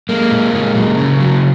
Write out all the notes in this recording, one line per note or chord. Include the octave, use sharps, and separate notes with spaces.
G#3 A#3
A#2
G#3
F#3
C#3
F#3